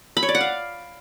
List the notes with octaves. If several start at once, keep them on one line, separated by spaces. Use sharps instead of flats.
B5
C#5
D5
F#5
F5